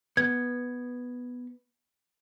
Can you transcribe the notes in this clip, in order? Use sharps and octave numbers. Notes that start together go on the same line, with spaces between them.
B3 G#6